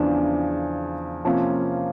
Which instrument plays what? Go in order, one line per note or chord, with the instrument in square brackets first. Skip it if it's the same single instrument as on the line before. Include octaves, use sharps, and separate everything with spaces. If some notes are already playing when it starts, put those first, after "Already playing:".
Already playing: [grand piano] E2 C#3 F3 [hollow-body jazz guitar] D4
[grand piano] C3 F3 A#3 C#4 F4